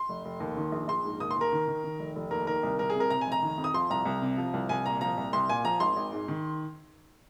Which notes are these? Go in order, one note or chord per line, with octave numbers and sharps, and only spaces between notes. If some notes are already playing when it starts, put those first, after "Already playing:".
Already playing: C6
F1
F1
D#2
D#3
A#1
A#1 C6
G#2
D#2 D#6
C6
D#2 A#4
D#3
D#3
D#3
F1
F1
D#2 A#4
D#3 A#4
C2
C2 A#4
G#4
C3 A#4
C3 A#5
G#5
F1
A#5
D#3
F2
D#6
F3 C6
C2 A#5
C2
C3
F3
C2
C2 G#5
A#2 A#5
F3 A#5
C2
C2 C6
A#2 G#5
F3 A#5
G#1 C6
G#1
G#2
D#3